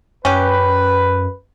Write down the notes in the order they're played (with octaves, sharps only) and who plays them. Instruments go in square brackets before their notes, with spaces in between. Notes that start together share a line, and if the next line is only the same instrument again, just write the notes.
[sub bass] F#2 [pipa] C#4 G4 [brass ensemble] B4